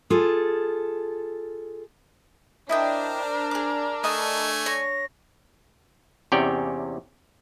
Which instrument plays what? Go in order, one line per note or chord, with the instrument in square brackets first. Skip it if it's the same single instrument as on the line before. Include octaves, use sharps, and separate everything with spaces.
[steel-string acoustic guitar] F4 G#4 A4
[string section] D4 [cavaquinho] E4 D#5 G5 [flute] A#4 [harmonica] C5
[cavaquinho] G#4 D6
[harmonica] A3 G#5 C#6 [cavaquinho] D#5 A5
[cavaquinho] C#5 [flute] A#6
[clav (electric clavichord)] E2 C3 C#4 C#5 D5 G5